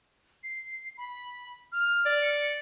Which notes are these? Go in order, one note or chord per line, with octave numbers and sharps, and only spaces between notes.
C7
B5
F6
D5
C#7